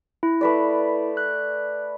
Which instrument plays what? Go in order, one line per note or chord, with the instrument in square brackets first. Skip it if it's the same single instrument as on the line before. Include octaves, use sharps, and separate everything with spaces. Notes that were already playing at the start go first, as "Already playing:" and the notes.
[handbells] E4
[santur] A3 B4 D5
[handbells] F#6